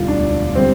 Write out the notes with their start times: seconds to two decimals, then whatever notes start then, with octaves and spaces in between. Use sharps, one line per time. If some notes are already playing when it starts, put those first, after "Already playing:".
Already playing: E1 D2 D3 G3 F4
0.08 D4
0.55 D3 G3 C4